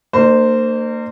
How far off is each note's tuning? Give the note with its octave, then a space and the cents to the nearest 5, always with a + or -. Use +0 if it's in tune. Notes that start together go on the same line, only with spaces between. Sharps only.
A#3 -35 D4 +45 C5 -5